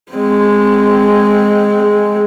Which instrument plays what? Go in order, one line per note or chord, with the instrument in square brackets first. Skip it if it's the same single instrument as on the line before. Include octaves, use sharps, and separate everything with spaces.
[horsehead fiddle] G#3 C4